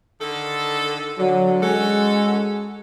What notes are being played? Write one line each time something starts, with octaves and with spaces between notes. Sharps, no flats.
D3 D#3 A4
D3 F#3
G#3 C#4 F#4 A4